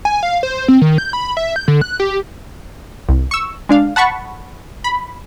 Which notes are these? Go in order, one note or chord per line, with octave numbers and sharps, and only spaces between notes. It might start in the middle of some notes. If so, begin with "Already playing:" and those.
G#5
F5
C5
C4
D#3
G6
B5
E5
G6
D3
F#6
G4
C2
C#6 E6
G#3 D4 F5
F#5 A5 B5 C#6
B5